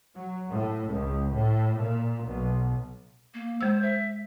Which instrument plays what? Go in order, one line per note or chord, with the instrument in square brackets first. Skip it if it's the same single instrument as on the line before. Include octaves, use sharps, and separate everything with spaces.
[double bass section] F#3
A2
C#2
A2
A#2
B1
[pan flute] A#3
[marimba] G#3 E6 [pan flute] C5
[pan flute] E5